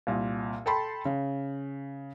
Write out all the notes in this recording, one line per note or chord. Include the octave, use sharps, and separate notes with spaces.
C2 A#2
A4 G5 A5 B5 C6
C#3